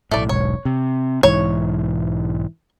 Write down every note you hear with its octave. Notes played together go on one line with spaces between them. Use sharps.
B1 A2 A3 D5
E1 B1 G#2 C#5
C3
B1 G#2 E3 C#5